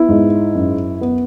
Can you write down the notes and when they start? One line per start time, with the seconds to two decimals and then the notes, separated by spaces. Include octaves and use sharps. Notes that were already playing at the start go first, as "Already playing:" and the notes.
Already playing: B3 E4
0.09 G#2
0.55 F#2
1.01 B3